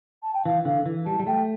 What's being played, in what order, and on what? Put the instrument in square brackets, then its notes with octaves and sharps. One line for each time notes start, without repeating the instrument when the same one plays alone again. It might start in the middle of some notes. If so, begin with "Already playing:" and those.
[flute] A5
G5
[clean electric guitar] E3 [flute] F5
[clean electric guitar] D3 [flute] F5
[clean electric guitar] E3
[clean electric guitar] G3 [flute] A5
[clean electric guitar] G3
[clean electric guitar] A3 [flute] G5